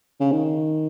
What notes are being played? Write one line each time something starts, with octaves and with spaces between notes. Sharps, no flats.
C#3
D#3